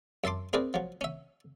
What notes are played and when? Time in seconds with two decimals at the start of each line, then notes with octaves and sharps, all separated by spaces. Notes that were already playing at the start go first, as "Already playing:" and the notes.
0.24 F#2 E5 A5 C6 D6
0.53 C4 E4 G#4 A#4 B4 D5
0.74 F3 F#3
1.01 C#4 E5